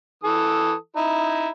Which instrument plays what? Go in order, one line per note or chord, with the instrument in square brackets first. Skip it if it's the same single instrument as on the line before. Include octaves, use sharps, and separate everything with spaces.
[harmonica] E3 A4 D#6
D#4 E4